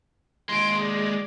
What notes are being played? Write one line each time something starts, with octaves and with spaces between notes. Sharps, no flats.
D#2 G#3 C6 D7
D5